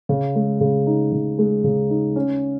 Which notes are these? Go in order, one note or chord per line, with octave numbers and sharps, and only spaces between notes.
C#3
G#3
C#3
D#4
C#3
G#3
C#3
D#4
C#4